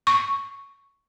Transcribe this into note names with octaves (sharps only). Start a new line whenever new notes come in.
C#6